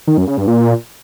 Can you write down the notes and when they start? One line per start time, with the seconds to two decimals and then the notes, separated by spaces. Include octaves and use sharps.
0.07 D#3
0.17 F#2
0.27 C#3
0.37 G2
0.47 A#2